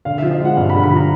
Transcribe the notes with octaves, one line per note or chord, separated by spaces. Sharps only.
D3 F5
F3 E5
D#5
G#3
F#5
G2 F5
D3 B5
B5
F3
A#5